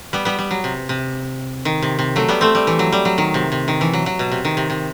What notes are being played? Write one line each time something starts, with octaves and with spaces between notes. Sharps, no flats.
G3 B3
G3 B3
G3
F#3
C3
C3
D#3
C3
C3
F#3 A3
G3 B3
A3 C4
G3
E3
F#3
G3
F#3
D#3
C3
C3
D#3
E3
F#3
F#3
B2
C3
D#3
C3
C3